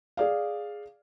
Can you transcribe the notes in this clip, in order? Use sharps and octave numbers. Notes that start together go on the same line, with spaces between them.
G#4 D5 F5